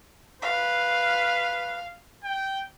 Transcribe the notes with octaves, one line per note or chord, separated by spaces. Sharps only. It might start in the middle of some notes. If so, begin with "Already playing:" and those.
B4 F5
G5